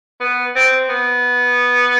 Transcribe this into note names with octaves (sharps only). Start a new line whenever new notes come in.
B3
C4
B3